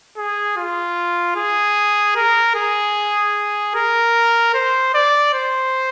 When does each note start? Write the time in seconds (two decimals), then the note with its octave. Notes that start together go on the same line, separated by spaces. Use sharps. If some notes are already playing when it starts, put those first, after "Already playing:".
0.17 G#4
0.57 F4
1.36 G#4
2.16 A#4
2.56 G#4
3.75 A#4
4.54 C5
4.94 D5
5.34 C5